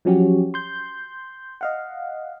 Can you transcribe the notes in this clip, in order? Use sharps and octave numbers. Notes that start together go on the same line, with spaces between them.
F3 F#3 C#4 F#4 G4
C6 G6
D#5 F5 F#5